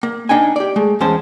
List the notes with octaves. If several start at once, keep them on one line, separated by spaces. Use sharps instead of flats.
A#3
A#3 D4 D#4 G5 G#5
G4 D5
G#3 A3
E2 G#3 C#4 C5 A5